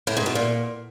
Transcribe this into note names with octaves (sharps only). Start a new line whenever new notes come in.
A2
G#2
B2
A#2